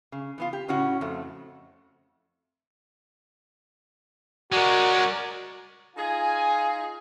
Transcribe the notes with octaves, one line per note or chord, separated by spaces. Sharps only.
C#3
E3 B3 F4
G4
A2 C#3 C#4 E4 F#4
F2 A3
G#3 C#4 F#4 A#4 D5
D#4 F4 G#4 G#5